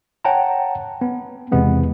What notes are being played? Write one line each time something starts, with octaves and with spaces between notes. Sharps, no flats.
C#5 F#5 G5 A5 A#5
B3
E2 C3 G#3 B3 C4